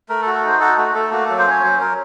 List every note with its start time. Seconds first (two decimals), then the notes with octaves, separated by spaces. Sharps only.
0.09 A3 A#4
0.22 A4
0.26 F#4
0.35 A4
0.43 D#4 C5
0.60 F#4 A4
0.78 A3 F#4
0.95 A3 A4
1.12 A#3 F#4
1.25 F#3 A4
1.38 C5
1.47 C#4 C#5
1.63 F#3 C5
1.80 F#3 A#4